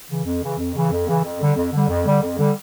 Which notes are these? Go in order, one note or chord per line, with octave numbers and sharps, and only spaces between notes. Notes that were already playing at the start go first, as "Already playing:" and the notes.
C#3 E3
F2
C#3 E3
F2
C#3 E3
F2
C#3 E3
F2
D3 G3
F2
D3 G3
F2
D3 G3
F2
D3 G3